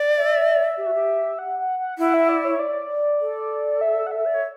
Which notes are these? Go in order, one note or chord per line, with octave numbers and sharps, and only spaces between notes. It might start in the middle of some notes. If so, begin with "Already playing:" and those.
Already playing: D5
E5
G4
F#4
G4
F#5
F#5
F#5
E4 F#5
E5
D5
C#5
D5
A4
E5
F#5
E5
D5
C#5